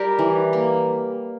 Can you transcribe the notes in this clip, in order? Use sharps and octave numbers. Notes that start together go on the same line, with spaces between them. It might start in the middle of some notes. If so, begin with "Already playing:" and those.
Already playing: G3 G4 A#4
E3
A#3